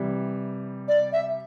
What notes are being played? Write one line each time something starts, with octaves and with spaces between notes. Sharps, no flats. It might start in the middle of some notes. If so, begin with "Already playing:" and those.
Already playing: C3 E3 G3
D5
E5